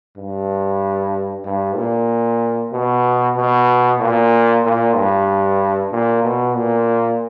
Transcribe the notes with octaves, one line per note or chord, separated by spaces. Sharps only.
G2
G2
A#2
B2
B2
A#2
A#2
G2
A#2
B2
A#2